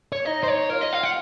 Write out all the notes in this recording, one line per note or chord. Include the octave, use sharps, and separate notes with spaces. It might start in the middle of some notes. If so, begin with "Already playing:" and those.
C#5
D#4 D#5
C5
C#5
F4 A#4
D#5
F5
F#5